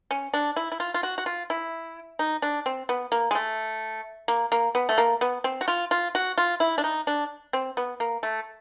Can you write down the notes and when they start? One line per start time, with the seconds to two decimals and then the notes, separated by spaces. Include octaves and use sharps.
0.11 C#4
0.34 D4
0.56 E4
0.72 E4
0.80 F4
0.94 F4
1.03 F#4
1.18 F#4
1.26 F4
1.50 E4
2.19 D#4
2.42 D4
2.66 C4
2.89 B3
3.12 A#3
3.31 G#3
3.35 A3
4.28 A#3
4.52 A#3
4.75 B3
4.89 A3
4.98 A#3
5.21 B3
5.44 C4
5.61 F#4
5.68 F4
5.91 F4
6.15 F#4
6.38 F4
6.60 E4
6.78 D4
6.84 D#4
7.07 D4
7.53 C4
7.77 B3
8.00 A#3
8.23 A3